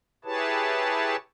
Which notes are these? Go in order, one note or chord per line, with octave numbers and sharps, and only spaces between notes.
E4 G4 G#4 B4 C#5 A5